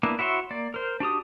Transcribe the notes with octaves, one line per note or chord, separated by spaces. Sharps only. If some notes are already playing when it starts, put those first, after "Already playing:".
A#3 B3 D4 E4
E4 F#4 C#5 E5 C6
A#3 D5
A#4 C5
D4 F#4 G4 D#6